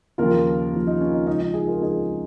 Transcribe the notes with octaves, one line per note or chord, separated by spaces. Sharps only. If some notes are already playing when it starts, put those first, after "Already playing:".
D#2 C#3 F3 F4 A#4
D#2 C#3 F3
D#4
C#4
D#4
C#2 C#3 F3 D#4
D#4
D#4 G#4
F4 A#4
C#2 C#3 F3 D#4 G#4